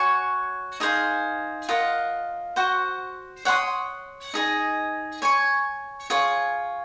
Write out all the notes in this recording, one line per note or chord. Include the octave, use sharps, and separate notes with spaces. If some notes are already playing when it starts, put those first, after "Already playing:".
Already playing: F#4 C#5 G#5 C#6
D#4 G#4 C5 F5
F4 A#4 D#5 F#5
F#4 C5 F#5
C#5 F#5 C6 D#6
D#4 G#4 D#5
C#5 G#5 C#6
F4 G#4 C#5